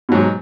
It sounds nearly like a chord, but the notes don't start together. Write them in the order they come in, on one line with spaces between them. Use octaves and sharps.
B2 F#3 G#2